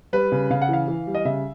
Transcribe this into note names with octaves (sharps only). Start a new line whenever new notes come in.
G3 B4
C#3
C#3 F5
F#5
E3 F5
E3
G3
D#5
C#3 E5